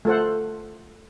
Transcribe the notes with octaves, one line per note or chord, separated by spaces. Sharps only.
A3 F4 A4 C5 F#5